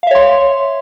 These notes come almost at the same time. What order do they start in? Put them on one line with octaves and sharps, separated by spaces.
F5 E5 C#5 C6